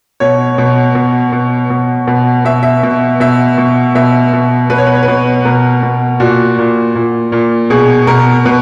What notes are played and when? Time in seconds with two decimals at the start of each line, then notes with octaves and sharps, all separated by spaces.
0.20 B2 C#5
0.58 B2
0.95 B2
1.32 B2
1.70 B2
2.07 B2
2.45 B2 E5
2.63 E5
2.83 B2
3.20 B2 E5
3.58 B2
3.95 B2 E5
4.33 B2
4.70 B2 B4
4.78 C#5
4.87 B4
4.95 C#5
5.03 B4
5.08 B2
5.45 B2 A#4
5.83 B2
6.20 A#2 F#4
6.58 A#2
6.95 A#2
7.32 A#2
7.70 B2 G#4
8.07 B2 A#4
8.45 B2 B4